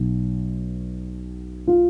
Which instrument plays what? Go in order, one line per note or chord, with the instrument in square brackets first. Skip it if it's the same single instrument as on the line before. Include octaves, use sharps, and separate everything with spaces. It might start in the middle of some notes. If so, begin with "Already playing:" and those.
Already playing: [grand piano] B1 B2
F4